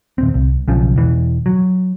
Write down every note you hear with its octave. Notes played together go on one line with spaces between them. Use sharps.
D#1 C4
C2
B1 C#3 F3
E1 E3
F#3